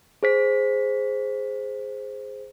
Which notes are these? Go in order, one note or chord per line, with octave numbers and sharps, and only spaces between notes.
G#4 C5 B6